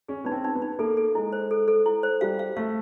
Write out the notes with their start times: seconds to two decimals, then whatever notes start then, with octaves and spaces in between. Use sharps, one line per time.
0.08 C#4 G#4
0.24 B3 D#4
0.32 C4
0.44 D#4
0.55 B3
0.62 D#4
0.79 A#3 A4
0.97 A4
1.15 G#3 E4
1.33 C5
1.51 A4
1.68 A4
1.86 E4
2.03 C5
2.21 G3 F5
2.39 F5
2.57 A3 F5